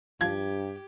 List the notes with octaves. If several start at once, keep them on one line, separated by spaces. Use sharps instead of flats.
G2 F3 G4 G#6